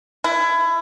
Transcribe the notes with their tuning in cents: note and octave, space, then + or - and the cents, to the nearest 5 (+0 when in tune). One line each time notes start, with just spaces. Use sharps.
E4 +25